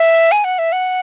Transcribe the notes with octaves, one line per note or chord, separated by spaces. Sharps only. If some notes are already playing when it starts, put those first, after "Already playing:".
Already playing: E5
G#5
F#5
E5
F#5